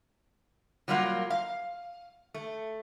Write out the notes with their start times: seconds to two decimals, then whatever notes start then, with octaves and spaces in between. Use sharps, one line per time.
0.88 F#3 G3 A#3 F4 F5 F#5
1.30 F5
2.34 A3